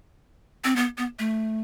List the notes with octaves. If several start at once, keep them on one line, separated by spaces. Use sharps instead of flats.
C4
B3
B3
A3